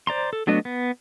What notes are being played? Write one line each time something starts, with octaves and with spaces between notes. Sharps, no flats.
C5 D5 A#5 C6
A4
F#3 A3 B3 D4 D#5
B3